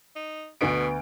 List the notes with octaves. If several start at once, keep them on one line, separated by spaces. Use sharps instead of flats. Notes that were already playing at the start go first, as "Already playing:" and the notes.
D#4
D2 B2 B3 D7